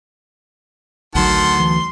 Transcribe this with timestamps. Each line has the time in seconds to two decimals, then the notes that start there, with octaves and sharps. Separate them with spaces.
1.15 A1 D2 D#3 F#3 F#5 A5 C6
1.60 E3